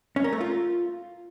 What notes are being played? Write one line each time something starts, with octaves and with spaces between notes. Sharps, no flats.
C#4
A#4
A3
F4